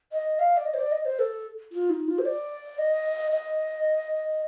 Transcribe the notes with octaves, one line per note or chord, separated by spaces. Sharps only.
D#5
F5
D5
D#5
C5
D5
D#5
C5
A4
F4
D#4
F4
C5
D5
D#5
D#5